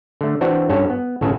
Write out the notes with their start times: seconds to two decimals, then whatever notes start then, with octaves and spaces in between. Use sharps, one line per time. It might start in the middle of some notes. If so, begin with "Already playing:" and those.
0.21 D3 A3
0.41 E3 C4 D4 F#4
0.69 G2 C#4 A4 C#5
0.90 B3
1.21 G1 A2 C#3 A4 B4 G#5